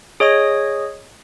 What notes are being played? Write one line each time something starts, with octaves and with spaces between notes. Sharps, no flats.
G#4 C#5 D#5 D#6